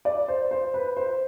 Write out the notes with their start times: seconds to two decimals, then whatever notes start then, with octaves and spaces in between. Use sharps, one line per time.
0.05 D5
0.28 C5
0.51 C5
0.74 B4
0.97 C5